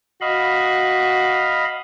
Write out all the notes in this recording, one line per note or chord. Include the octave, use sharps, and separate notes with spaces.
F#4 D#5 F5 B5